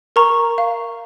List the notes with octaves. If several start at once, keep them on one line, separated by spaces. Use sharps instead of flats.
A#4 A#5 C#6
F5